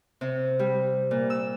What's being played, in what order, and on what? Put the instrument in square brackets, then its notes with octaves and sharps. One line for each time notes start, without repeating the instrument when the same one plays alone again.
[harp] C3
G3
A#2
E6